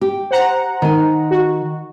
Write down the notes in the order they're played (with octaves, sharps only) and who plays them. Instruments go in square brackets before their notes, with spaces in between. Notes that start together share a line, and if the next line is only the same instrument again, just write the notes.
[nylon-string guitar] G4
[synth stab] C5 F#5 A#5
[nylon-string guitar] D#3 G#5
[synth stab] F#4